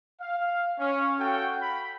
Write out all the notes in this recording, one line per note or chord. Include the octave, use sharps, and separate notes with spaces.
F5
C#4
F#4 A4 F5 G5
B5